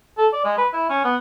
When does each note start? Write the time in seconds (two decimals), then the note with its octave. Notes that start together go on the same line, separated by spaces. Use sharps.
0.18 A4
0.33 D5
0.45 G#3
0.58 B4
0.73 E4
0.90 C#4
1.05 B3